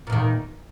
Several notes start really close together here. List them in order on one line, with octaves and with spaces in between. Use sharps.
A#2 E2 D#3